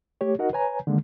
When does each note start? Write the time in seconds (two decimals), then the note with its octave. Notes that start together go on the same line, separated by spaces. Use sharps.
0.21 A3 G4 C#5
0.39 D#4 F#4 A#4 D#5 F#5
0.53 B4 C#5 G#5 A#5
0.87 D3 D#3 G#3 A#3